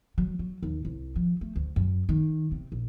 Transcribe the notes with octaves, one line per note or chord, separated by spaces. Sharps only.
F#3
F#3
D#2
C2
F3
A3
D2
F#2
D#3
C3
A#1